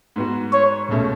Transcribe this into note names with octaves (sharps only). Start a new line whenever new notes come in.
G#2 G#3 B3 F#4
C#5
C#2 B2 A3 C#4